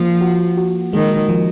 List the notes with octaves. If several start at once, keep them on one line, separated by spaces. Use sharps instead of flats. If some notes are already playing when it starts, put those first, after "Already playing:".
Already playing: F3 A#3
F#4
F#4
D#3 G#3
F3